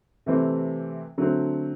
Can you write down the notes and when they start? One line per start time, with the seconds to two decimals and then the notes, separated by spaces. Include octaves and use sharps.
0.26 C3 E3 A3 C4
1.18 D3 F#3 A3 C4